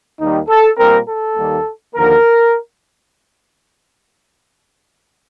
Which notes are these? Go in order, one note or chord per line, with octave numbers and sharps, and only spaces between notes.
D#2 D#3 G3 D#4
A4
A#2 G3 C4 A#4
A4
D#2 D#3 G3 A#3
D#2 D3 F3 A#3 A#4